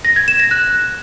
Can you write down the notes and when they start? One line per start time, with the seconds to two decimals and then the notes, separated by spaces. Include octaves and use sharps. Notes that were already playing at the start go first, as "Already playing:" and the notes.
0.05 A#6
0.16 G#6
0.28 E7
0.39 A#6
0.51 F#6